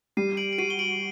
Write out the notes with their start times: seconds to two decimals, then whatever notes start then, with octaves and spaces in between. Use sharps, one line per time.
0.17 G3 C7 D#7
0.37 D7 F#7
0.53 D7
0.58 F#4 C7 D#7
0.70 G7
0.79 D7 F#7